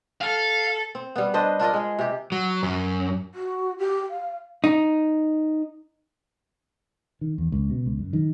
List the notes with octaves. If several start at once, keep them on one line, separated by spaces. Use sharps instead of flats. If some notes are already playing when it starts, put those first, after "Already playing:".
A4 F5
C4
G3 B3
D4 B4 C5 D#5
D4 F4 A#4 D#5
G#3 G#4
C3 G4
F#3
F#2
F#4
G4
F5
D#4
D#3
E2
C#2
B2
C#2
F#2
D#3